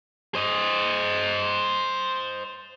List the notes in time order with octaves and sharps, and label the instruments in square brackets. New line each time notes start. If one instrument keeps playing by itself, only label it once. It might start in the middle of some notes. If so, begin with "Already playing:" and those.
[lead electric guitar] C5 D#5